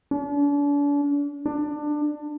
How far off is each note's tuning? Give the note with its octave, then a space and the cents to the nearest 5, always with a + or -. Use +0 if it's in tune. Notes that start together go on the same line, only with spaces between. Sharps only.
D4 -40
D4 +20